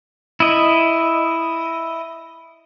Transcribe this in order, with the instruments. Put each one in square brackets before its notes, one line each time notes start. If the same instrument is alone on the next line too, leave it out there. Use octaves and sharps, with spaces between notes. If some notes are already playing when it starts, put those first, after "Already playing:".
[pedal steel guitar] E4 D#5